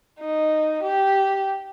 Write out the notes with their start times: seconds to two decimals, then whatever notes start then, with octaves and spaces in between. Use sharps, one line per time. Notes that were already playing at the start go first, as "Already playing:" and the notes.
0.19 D#4
0.83 G4